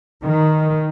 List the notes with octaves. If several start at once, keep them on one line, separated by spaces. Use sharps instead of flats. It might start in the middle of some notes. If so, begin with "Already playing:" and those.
D#3